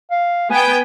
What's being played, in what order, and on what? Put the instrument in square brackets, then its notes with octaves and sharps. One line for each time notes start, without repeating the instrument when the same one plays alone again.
[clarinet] F5
[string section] B3 G5 [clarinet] G#5